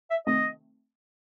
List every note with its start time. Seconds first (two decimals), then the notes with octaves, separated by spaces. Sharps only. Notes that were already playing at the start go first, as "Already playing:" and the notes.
0.10 E5
0.27 C3 D#3 A3 C4 D#5